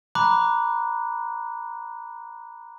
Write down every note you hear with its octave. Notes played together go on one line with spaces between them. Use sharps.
A#5 B5 D6 F#6